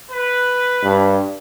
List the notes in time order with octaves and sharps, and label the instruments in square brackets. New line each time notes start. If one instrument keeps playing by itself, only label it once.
[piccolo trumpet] B4
[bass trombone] G2